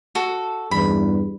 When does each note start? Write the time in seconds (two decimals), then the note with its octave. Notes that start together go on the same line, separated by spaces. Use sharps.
0.15 F#4 A4
0.71 E2 G2 B5